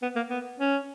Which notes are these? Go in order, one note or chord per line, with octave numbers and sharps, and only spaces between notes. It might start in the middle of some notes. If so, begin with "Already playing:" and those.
B3
A#3
B3
C#4